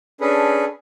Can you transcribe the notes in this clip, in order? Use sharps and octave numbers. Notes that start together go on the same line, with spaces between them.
C#4 D4 G#4 A4 B4